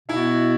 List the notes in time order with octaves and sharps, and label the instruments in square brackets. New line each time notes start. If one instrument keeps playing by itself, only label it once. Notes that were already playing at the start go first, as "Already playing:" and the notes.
[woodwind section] B2 B3 F#4 [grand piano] E4 E5